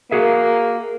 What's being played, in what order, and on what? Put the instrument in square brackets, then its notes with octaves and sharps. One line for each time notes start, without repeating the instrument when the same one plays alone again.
[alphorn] A#3 [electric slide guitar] F#4 G#4 E5